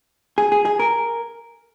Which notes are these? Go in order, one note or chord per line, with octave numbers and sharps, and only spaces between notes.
G#4
G#4
G#4
A#4